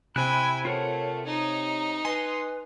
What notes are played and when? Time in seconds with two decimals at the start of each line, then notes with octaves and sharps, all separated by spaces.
0.16 C3 C4 E4 G5 G#5 B5 F#6
0.65 A3 F4 A#4 C#5 F#5
1.26 D#4 C#5 A#5
2.05 B4 D#5 G#5 C6